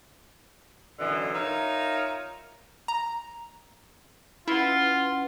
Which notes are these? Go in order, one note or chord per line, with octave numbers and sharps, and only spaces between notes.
F#2 B2 D3 E3
D#4 F4 A#4 C#5 E5
A#5
C#4 E4 F4 B4 F#5